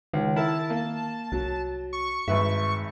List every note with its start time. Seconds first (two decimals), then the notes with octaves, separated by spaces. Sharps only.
0.13 C#2 D#3
0.36 E4 A#4 A5
0.70 A#3
1.32 C2 F#3
1.93 C#6
2.28 G#1 G2 B4 E5